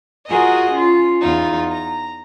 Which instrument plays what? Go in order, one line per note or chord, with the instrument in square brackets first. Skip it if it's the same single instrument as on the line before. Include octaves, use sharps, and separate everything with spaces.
[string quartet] F4 F#4 G#4 A#4 D#5 G#5
C#4 F4
E2 D#4 F4
A#5